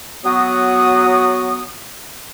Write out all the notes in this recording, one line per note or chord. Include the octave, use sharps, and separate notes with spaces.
F#3 B3 F#4 D#6